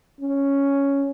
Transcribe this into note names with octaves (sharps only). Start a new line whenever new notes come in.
C#4